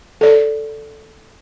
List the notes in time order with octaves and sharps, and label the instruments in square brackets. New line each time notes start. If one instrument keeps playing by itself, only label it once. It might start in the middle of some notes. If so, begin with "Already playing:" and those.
[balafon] A4 D5